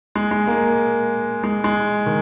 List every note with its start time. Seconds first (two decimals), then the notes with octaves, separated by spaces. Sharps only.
0.15 G#3
0.31 G#3
0.47 A#3
1.43 G#3
1.64 G#3
2.06 D#3